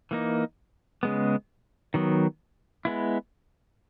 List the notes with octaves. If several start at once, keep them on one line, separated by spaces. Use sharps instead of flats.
E3 A#3 D#4
C#3 G#3 B3
D#3 F#3 B3
G#3 B3 E4